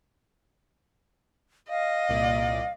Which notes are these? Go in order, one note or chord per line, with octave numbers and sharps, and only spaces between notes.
D#5 F5
C2 A#2 D5